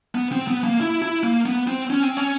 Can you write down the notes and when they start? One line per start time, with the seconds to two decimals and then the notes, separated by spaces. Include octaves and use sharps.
0.15 B3
0.32 C4
0.47 B3
0.64 A#3
0.81 E4
1.02 E4
1.23 A#3
1.46 B3
1.67 C4
1.90 C#4
2.03 C4
2.17 C#4